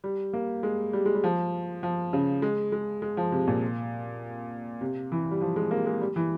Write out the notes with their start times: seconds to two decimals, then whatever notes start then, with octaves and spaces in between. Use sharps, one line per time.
0.04 G3
0.33 A#3
0.63 G#3
0.93 G3
1.06 G#3
1.15 G3
1.24 F3
1.83 F3
2.13 C#3
2.42 G#3
2.72 G#3
3.02 G#3
3.17 F3
3.32 C3
3.47 A#2
4.81 C3
5.12 E3
5.31 G3
5.41 F3
5.56 G#3
5.71 A#3
5.86 G#3
6.01 G3
6.16 E3